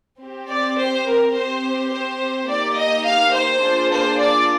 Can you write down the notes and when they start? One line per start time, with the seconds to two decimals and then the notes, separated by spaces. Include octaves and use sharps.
0.20 C4 G4
0.50 D5
0.77 C5
1.06 A#4
1.34 C4 G4 C5
1.91 C5
2.48 A#3 D#4 G4 D5
2.75 D#5
3.04 F5
3.33 C5
3.61 A#3 D4 F4 G#4
3.90 C5
4.18 D5